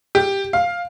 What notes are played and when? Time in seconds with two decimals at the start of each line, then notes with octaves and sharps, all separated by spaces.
0.15 G4
0.53 F5